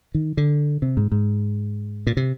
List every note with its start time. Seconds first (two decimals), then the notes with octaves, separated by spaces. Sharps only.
0.15 D#3
0.37 D3
0.82 C3
0.97 G#2
1.12 G#2
2.07 A#2
2.17 C3